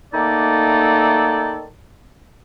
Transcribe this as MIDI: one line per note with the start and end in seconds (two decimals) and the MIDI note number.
0.13 1.66 51
0.13 1.66 57
0.13 1.66 58
0.13 1.66 63
0.13 1.66 69
0.13 1.66 74